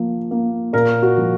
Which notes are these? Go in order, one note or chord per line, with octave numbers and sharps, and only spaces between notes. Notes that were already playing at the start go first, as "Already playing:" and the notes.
Already playing: F3 A#3
A#3
A#2 A#4
F#4
F3